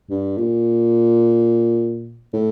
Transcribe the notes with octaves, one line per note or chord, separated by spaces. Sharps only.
G2
A#2
A2